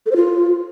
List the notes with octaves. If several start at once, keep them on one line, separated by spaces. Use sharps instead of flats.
A4
C5
F4